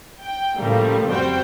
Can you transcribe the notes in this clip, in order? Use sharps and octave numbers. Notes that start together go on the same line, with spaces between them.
G5
A2 C#3 F3 G3 A3 A#3
F2 G3 F#4 C5 G5